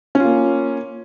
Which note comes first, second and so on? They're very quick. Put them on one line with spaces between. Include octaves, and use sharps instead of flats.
C#4 F4 A#3